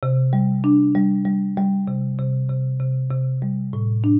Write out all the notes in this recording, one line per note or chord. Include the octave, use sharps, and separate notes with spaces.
C3
G3
D4
G3
G3
G3
C3
C3
C3
C3
C3
G3
A2
D4